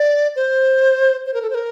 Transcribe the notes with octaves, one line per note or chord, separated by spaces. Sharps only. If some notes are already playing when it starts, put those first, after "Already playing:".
Already playing: D5
C5
C5
A#4
A4
C5
A#4